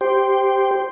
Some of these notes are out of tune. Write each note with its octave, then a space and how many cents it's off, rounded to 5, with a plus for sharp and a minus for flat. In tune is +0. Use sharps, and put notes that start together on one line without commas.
G4 +0 C5 -5